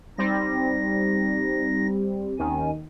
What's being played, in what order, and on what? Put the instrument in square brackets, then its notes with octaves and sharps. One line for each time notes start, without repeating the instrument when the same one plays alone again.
[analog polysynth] G3 C4 [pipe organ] D#4 A#6
[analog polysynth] D#2 D#3 [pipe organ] C#4 G#5